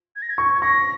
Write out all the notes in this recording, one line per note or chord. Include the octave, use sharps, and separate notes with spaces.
G#6
A#6
G#6
C#6
G#6
C#6 A#6